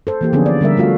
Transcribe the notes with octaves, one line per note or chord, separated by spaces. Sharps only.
A4 C5
E3 A#3 G4
D3 F3 B3 C#4 D4 G#4
D5
D3 G3 A#4 E5
G3 A3 F4 F#4 F5